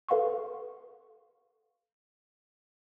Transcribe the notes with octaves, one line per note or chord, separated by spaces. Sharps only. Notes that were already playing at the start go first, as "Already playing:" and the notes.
A4 B4 F5 F#5 C6 C#6